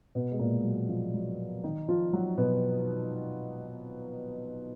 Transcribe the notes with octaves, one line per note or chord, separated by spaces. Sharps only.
B2 B3
G#3
A#2 A#3
F#3
F3
F#3
D#3 D#4
F3 F4
F#3 F#4
B2 B3